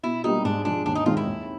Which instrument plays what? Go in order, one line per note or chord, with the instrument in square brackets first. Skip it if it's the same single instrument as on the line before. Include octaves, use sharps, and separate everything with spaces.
[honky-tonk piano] B2 [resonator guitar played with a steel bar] E4
[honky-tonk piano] G3 A#3 D4 G4 [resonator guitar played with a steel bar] D#4
[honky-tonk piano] G#2 [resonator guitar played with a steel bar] D4
[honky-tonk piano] F3 G#3 [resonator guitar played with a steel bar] D4
[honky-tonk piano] D#2 [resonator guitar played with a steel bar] D4
[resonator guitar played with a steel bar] D#4
[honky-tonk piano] D#3 G#3 C4 D#4 [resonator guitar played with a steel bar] F4
[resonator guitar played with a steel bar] E4
[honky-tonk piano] D#2